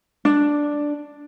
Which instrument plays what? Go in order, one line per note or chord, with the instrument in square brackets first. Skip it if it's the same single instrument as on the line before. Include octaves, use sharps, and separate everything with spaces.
[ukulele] D4